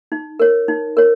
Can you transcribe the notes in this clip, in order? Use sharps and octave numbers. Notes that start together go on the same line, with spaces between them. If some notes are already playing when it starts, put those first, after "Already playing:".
D#4
A#4 C#5
D#4
A#4 C#5